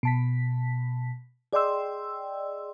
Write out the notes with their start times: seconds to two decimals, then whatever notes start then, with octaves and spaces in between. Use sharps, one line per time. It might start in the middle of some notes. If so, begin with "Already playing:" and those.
0.03 B2 A5 B6
1.53 G#4 D5 D#5 G5 C6 E6